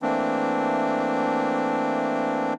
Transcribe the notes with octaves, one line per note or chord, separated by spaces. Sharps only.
E3 A3 A#3 C4 D4